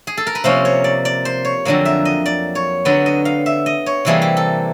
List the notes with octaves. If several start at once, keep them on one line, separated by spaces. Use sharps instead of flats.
G#4
A4
A#4
B4
C3 F3 A#3 C#4 C5
C#5
D5
D5
C5
C#5
F2 D3 F#3 A#3
E5
D#5
D5
C#5
D3 F#3 B3 D5
D#5
F5
E5
D#5
C#5
C3 E3 G3 A#3 G#4
G4
A4